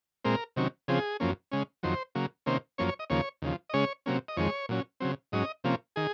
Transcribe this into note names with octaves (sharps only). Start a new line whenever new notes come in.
A#2 G#3 C4 A#4
C3 D#3 F#3 C#4
C#3 F3 C4 G#4
F#2 F3 A#3 C#4
C#3 G#3 C#4
F2 D#3 F#3 C5
C#3 F#3 A#3
C3 D#3 A#3 C#4 C5
F#2 F3 A#3 C#4 C#5
C#5
D#5
D#2 C#3 F3 A#3 C#5
D#2 C#3 F3
D#5
C#3 G#3 C#4 C#5
C3 F#3 A#3 C#4
D#5
F2 D#3 G#3 C#5
A#2 F#3 C#4
C#3 F#3 C4
G#2 F#3 C#4 D#5
C3 F3 A#3 C#4
D#3 G#4